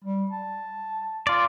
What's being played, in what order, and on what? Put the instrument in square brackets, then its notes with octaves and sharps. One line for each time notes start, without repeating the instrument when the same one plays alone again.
[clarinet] G3
A5
[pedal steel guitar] F4 D5